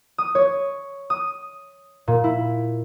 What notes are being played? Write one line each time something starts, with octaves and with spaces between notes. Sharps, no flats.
D#6
C#5
D#6
A#2
E4